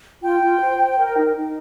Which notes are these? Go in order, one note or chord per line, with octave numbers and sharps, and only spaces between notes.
F4 G5
F4
C5
C5
A#4
D#4
D#4